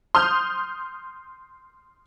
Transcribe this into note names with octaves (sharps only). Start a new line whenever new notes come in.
C6 D#6 F6 G6